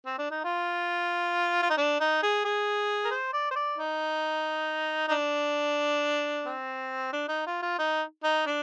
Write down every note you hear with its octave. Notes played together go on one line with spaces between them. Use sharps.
C4
D4
D#4
F4
F4
D#4
D4
D#4
G#4
G#4
A#4
C5
D5
C5
D5
D#4
D#4
D4
C4
D4
D#4
F4
F4
D#4
D#4
D4